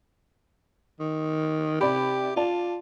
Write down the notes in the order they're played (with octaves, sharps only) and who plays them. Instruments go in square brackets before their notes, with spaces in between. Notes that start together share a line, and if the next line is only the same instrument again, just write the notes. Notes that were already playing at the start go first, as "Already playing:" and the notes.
[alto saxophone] D#3
[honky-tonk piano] C3 D5 B5 [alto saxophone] G4
[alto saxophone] F4 [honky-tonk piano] D5 A5